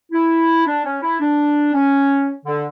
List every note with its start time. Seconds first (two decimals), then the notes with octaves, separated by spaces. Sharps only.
0.12 E4
0.66 D4
0.84 C#4
1.02 E4
1.20 D4
1.74 C#4
2.45 D3